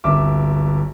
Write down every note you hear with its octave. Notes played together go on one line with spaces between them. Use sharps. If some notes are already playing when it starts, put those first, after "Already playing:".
D1 G1 E5 D6